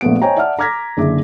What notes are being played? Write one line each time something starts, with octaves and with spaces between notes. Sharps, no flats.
A#1 A3 B3 D7
C5 C#5 D#5 G5 G#5 A#5
D5 E5 F#5 A5 F6
A#5 D6 F6 G#6 A#6 B6
F#1 D3 G#4 E5 D6